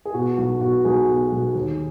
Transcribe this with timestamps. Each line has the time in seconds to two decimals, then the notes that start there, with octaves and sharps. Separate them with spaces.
0.05 G#4
0.14 B2 F#4
0.37 B1 F#4
0.61 B2 F#4
0.85 B1 G#4
1.09 B2
1.32 B1
1.55 D#2